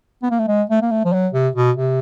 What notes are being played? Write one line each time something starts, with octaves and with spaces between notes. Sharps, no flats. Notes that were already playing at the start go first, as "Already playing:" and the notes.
B3
A#3
A3
G#3
A3
A#3
A3
F3
F#3
C3
B2
C3